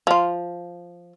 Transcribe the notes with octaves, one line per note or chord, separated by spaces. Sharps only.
F3 F4